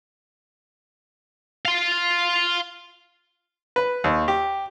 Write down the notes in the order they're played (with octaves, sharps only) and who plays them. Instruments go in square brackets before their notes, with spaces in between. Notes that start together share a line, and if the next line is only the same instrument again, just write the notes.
[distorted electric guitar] F5 C6
[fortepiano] B4
D#2
G4